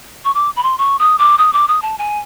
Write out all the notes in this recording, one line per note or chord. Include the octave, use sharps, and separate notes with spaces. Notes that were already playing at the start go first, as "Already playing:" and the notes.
C#6
D6
B5
C6
C#6
D#6
D6
D#6
D6
D#6
A5
G#5